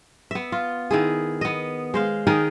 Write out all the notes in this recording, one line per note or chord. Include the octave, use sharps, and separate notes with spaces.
B3 E5
F4
D#3 E4 G#4
B3 D#5
G#3 C5 F5
D#3 D#4 G#4 A#4